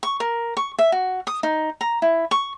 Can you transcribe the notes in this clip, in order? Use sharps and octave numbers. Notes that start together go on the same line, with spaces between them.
C#6
A#4
C#6
E5
F#4
D#6
D#4
A#5
E4
C#6